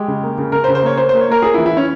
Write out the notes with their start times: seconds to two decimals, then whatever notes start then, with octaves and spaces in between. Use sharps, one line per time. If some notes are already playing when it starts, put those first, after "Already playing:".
Already playing: G#3 G4
0.08 C#3
0.23 A#3
0.38 C#3
0.52 C#3 A#4
0.64 C5
0.68 C#3
0.75 C5
0.83 A#3 C#5
0.97 A#3 C5
1.09 A#3 C5
1.21 C#5
1.28 A#3 A#4
1.42 A#3 G#4
1.54 E4
1.58 E3
1.66 E4
1.73 E3 C#4